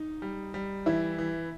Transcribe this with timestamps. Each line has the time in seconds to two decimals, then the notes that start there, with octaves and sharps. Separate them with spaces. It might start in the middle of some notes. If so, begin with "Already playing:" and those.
Already playing: D#4
0.22 G3
0.54 G3
0.86 E3 E4
1.18 E3